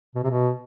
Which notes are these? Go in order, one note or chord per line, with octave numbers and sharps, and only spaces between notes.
B2
C3
B2